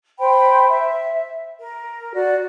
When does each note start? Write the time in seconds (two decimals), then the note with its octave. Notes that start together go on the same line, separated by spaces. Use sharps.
0.18 C5 G5 B5
0.68 E5
1.61 A#4
2.15 F#4 D5